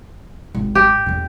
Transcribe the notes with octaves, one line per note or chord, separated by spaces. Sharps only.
G#1
G4
E2 D3